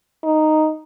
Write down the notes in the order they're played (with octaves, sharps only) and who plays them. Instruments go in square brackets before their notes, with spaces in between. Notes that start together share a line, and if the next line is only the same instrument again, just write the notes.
[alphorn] D#4